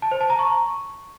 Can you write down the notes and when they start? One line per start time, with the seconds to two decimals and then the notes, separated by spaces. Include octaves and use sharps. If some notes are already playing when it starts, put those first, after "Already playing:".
0.02 A5
0.11 C5
0.21 A5
0.30 A#5
0.39 C#6